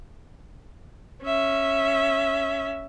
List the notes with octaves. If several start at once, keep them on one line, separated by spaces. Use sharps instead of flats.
C#4 E5